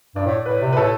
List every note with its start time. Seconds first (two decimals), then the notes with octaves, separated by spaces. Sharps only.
0.15 G2 D5
0.26 A2
0.46 A2 B4
0.61 C3
0.73 B4
0.77 A2 A4